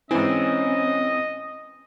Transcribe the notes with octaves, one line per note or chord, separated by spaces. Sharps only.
G#2 E3 C4 C#4 D#5